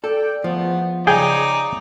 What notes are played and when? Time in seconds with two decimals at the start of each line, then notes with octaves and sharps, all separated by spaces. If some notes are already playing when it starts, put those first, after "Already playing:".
0.04 A4 D5 G5
0.44 E2 F3 A3 B3
1.07 C#3 D#4 G#4 D5 G5